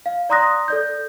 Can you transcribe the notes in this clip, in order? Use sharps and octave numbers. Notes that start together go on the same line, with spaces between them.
F5
D5 A#5 C6 D#6 F#6 A#6
A4 D5 G6